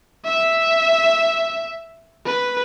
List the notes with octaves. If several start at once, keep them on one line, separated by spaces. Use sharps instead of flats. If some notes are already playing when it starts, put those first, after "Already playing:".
E5
B4